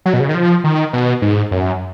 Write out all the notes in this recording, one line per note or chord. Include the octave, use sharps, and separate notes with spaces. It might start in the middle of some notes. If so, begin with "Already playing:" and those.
F#3
B2
C#3
D#3
F3
D#3
B2
G#2
F#2